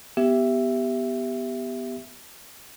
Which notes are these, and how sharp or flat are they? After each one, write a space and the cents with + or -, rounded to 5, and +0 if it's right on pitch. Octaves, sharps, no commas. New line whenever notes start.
B3 +0 G4 +0 E5 +10